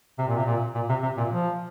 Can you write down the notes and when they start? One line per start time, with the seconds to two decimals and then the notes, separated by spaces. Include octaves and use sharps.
0.18 C3
0.28 A#2
0.36 C3
0.46 A#2
0.74 A#2
0.89 C3
1.02 C3
1.17 A#2
1.32 F3